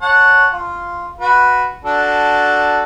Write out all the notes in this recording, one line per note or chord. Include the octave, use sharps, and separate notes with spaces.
C#5 F#5 A5
F4
F#4 B4
D4 F#4 A4